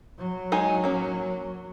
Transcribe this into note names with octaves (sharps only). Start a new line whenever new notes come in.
F#3
G#3 D#4 G#5
A#3 C#4